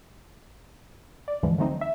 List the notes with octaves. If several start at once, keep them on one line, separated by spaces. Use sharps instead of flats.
D5
D2 G2 D3 E3 F3 G#3
D3 F#3 A3 C4 D#4
E5